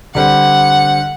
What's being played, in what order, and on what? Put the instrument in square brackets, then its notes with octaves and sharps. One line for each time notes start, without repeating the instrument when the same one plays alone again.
[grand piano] D3 G3 C4 [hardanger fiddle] F#5